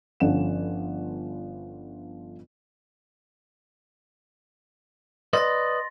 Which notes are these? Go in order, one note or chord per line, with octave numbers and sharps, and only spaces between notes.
G1 F3 C#4 A4 F#5 E7
B4 D5 D#5 C6 A6 A#6